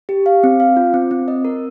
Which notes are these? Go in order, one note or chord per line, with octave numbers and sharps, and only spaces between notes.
G4
F5
C4
F5
F4
C4
C4
D#5
A#4